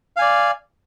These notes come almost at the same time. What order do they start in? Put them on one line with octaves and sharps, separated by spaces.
F5 G#5 D5